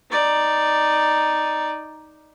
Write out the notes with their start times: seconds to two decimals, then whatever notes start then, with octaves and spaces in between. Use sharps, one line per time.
0.10 D#4 D5